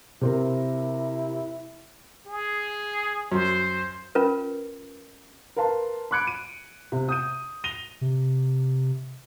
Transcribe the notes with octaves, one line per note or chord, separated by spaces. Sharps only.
C3 C4 E4 A#4
G#4
F#2 C5
C#4 F4 A#4 B4
A#4 B4 F5 A5 C6
B5 D6 F#6 G#6 C#7 D7
D#7
C3
D#6 G6 D#7
A#6 D#7 F7 G7
C3